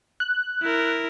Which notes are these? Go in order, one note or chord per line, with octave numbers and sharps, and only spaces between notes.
F#6
E4 A#4